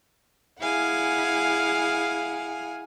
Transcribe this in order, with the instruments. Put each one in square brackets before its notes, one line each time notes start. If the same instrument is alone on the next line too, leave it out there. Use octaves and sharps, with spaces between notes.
[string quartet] E4 G#4 F5 F#5 G#5